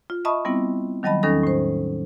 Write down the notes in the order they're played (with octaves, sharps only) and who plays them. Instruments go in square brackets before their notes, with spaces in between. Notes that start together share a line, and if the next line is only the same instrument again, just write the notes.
[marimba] F4
D#5 E5 A5 B5 C#6 D#6
G3 B3 C4 E4
D#3 F#3 G3 D#5 A5 B5
E2 D#3 C#4 D#4 A4 A#6
A2 C5